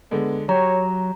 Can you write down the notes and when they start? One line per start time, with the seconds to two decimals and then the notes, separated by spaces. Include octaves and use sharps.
0.11 D3 G#3 B3
0.49 F#3 G4 C#5 A#5